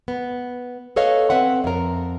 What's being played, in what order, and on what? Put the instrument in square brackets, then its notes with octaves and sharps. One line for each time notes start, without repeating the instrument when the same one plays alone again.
[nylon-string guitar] B3
A4 B4 C#5 D#5 F5
C4 B4 E5 F#5
F2 A#4